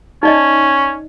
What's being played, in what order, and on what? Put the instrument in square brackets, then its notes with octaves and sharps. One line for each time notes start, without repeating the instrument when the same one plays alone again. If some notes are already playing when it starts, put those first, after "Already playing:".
[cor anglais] C#4 [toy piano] D#4 D5 D#5